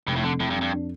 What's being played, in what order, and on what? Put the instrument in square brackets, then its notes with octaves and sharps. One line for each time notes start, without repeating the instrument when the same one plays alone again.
[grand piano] F1 [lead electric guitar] G2
[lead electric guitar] A2
[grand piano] F2 [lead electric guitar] D3
[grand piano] F2 [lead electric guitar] A2
[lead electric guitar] G2
[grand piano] F2
[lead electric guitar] G2
[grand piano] D4